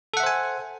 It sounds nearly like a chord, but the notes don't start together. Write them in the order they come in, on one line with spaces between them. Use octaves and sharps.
A4 F#5 E5 C5 G#5